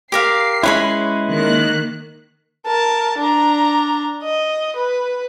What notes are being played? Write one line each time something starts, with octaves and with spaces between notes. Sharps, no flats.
G4 A#4 F5 C7
G#3 C#4 E4 B4 C#5 B5
D#3 A#3 F#6
A#4 A5
D4 A#5
D#5
B4